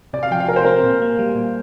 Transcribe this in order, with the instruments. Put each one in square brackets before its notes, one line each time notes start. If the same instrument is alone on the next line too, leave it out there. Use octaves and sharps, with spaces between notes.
[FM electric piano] C3 [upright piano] D5
[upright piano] F5
[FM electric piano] F3 [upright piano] G5
[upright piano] F5
[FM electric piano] C3 [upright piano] A#4
[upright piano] C5
[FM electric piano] C4 [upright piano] A#4
[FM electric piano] A#2
A#3
G3
A#2